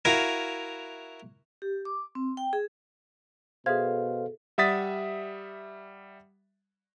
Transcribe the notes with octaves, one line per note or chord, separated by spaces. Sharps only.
E4 F#4 A#4 F5 G#5
G4
D6
C4
G5
G#4
B2 G#4 A4 C5 E5 F5 G#6
G3 E5 F#5 D#6 A6 B6